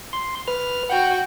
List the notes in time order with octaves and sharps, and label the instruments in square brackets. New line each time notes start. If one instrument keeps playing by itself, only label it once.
[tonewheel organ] C6
B4 F6
[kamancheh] F#4 G5 [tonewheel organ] F#5